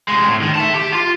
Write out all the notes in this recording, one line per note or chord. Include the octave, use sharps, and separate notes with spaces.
C3 G#3
A2
D#3
E5 A5
G4
F4